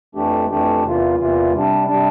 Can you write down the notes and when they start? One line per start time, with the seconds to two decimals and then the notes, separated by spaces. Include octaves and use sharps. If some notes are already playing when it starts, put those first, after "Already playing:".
0.15 F2 E3 A3 D4 G4
0.50 F2 E3 A3 D4 G4
0.85 E2 C3 E3 A#3 F4
1.18 E2 C3 E3 A#3 F4
1.53 C3 G3 D4
1.88 C3 G3 D4